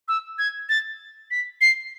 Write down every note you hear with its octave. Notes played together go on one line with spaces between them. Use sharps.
E6
G#6
A6
B6
C7